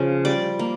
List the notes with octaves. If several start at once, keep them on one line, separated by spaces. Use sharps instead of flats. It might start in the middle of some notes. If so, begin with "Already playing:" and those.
Already playing: C#3 F3
G3 D5
A#3